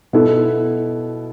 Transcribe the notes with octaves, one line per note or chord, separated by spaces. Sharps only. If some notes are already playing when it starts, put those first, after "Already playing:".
B2 B3 E4 A4